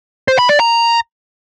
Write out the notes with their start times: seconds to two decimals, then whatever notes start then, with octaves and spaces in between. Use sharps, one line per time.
0.28 C5
0.39 B5
0.49 D5
0.60 A#5